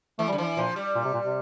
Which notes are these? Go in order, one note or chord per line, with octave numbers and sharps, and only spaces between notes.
E3 A3
G3
D3
E3 F3
A#2 F3
G3
A#2
C3
A#2
C3